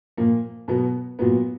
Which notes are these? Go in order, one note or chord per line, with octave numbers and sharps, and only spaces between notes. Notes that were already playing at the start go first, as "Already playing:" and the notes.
A#2 F3 A#3
B2 F#3 B3
A#2 F#3 B3